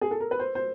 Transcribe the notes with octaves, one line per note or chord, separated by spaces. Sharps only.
G#4
A4
A#4
B4
C5
C5